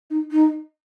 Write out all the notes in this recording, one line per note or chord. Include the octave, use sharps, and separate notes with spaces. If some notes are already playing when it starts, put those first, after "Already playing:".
D#4
D#4